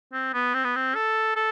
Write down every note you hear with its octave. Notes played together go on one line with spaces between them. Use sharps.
C4
B3
C4
B3
C4
A4
A4